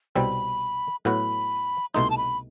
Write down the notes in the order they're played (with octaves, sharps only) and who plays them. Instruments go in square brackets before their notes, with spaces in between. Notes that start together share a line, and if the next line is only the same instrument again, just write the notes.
[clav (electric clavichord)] C2 B2 G3 C4 [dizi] B5
[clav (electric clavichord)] A2 F#3 B3 F#4 [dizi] B5
[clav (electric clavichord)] C2 B2 A3 D#4 [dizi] C6
[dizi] A5
B5